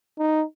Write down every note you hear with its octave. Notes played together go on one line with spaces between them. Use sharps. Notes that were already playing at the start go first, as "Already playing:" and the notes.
D#4